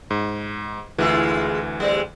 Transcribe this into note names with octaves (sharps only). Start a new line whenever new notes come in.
G#2
D2 E3 G#3 E4 F4
G3 G#3 C4